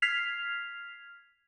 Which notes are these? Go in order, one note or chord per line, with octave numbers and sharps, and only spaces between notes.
F6 G#6 B6 C7 F7